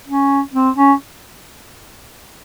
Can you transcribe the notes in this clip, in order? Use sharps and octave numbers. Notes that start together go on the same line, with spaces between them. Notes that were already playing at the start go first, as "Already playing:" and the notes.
C#4
C4
C#4